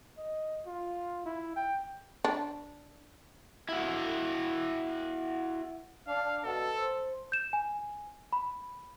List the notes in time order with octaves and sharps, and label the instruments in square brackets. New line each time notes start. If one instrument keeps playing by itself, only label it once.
[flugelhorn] D#5
F4
E4
G5
[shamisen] D4
[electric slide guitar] E4 F#4
[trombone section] D4 [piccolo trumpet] F5
[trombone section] B2 [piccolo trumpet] A4
[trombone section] C5
[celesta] G6 E7
G#5
B5